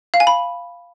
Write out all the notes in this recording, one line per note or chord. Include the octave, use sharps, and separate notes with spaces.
F5
G#5
B5